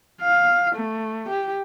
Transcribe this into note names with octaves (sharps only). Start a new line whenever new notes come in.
F5
A3
G4